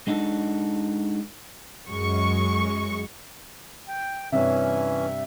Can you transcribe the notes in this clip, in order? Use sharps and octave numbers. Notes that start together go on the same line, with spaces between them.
G#3 D4 D#4 F#4 A4
F#2 G#3 C#6
G5
G2 C3 E3 C#4 E5